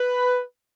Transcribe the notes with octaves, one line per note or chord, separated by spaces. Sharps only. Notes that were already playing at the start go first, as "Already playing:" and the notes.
Already playing: B4